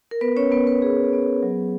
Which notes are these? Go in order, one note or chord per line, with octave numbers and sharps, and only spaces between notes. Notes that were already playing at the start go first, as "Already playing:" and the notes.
A#4
B3 B4
C#4 C#5
B3 B4
B3 B4
B3 G#4
B3
F#3